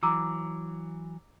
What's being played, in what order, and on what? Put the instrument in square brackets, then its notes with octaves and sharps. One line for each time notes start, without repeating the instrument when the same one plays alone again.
[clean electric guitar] E3 F#3 [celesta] A#5 D6 E6